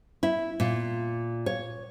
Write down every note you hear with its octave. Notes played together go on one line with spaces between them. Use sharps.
E4
A#2
C#5